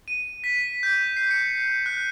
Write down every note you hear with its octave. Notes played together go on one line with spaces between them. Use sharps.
D#7
B6
G6
C7
C#7
F#6